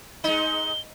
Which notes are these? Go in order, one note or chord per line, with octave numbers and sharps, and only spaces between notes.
G#3 D#4 D#5 G7